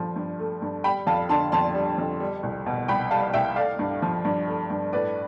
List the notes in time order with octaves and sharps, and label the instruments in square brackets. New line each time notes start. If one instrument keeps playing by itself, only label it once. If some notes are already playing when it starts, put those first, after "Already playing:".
Already playing: [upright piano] G2 F3 A3 C6
G2
A3
G2
G3 G5 B5
F2 F5 A5
D3 A5 C6
F2 A5 C6
G3
F2
G3
C2
B2
C2 G5 B5
G3 F5 A5
C2 E5 G5
A3 D5 F5
G2
F3
G2
A3
G2
A2 B4 D5